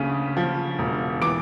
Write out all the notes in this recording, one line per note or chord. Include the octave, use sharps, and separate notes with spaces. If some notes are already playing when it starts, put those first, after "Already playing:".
Already playing: D2 C#3 D#6 D#7
F3
E1
E3 D6 D7